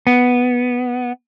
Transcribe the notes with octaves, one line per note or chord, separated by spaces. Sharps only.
B3